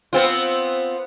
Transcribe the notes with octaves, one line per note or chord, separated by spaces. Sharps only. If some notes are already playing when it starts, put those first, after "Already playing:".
B3 C4 F4